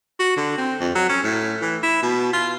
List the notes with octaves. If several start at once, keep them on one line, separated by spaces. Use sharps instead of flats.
F#4
D3
C4
F2
F#3
C#4
A2
E3
E4
B2
F4